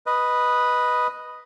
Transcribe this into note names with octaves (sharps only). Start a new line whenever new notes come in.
B4 D#5